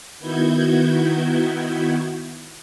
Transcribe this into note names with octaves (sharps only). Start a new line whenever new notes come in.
D#3 B3 E4 F#4 G6 G#6